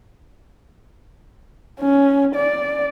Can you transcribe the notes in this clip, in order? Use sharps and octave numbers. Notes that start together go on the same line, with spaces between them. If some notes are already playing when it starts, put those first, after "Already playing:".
C#4
D5